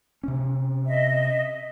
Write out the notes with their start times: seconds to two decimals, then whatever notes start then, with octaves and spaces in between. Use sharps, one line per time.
0.23 C3 C#4
0.86 D#5 E5